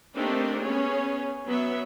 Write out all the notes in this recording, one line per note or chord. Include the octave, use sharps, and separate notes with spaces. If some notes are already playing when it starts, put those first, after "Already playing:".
A3 A#3 C4 D4 D#4 G4
B3 C#4 G#4 C#5
F#3 B3 E5